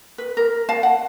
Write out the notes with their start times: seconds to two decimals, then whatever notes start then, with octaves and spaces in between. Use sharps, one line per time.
0.18 B4
0.37 A#4
0.69 F5 A5
0.83 F#5